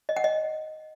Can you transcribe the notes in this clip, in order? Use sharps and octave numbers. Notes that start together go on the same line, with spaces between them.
D#5
F#5
D#5